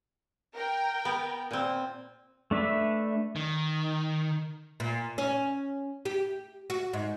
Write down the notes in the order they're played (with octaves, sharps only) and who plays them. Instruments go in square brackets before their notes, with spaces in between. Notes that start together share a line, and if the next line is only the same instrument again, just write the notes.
[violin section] A#4 G5
[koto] B3
A#2 C4
[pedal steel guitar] A3 D4 B4 E5
[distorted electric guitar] D#3
[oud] A#2
C#4
G4
F#4
G#2